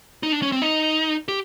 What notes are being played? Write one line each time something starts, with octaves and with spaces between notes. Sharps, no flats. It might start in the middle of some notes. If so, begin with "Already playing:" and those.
D#4
D4
C#4
C4
D#4
G4